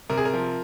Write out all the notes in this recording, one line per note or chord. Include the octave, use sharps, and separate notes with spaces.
C3 A#4
G#4
A#4
F3